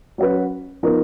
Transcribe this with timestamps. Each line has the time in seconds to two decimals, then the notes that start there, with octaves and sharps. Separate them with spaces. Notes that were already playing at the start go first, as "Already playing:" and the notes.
0.18 F#3 C#4 F#4 B4
0.83 F3 B3 D#4 A#4